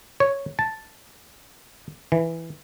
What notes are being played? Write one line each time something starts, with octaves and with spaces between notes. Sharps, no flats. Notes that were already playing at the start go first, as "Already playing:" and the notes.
C#5
A5
E3